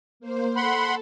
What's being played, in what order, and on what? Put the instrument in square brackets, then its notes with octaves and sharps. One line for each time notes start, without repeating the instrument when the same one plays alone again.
[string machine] A#3 C5
[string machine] A4 [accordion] F#5 B5 C6